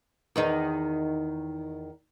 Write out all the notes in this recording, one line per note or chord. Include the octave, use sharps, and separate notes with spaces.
E2 D#3 D#4